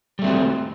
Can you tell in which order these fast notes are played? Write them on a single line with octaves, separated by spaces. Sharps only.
G3 A3 C4 F#4